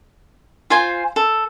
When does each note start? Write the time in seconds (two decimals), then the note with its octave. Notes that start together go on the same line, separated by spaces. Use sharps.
0.70 F4 C5 G#5
1.16 A4